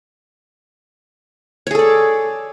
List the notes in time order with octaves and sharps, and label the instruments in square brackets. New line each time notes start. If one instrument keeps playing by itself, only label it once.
[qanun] C#5
G#4
A4
D5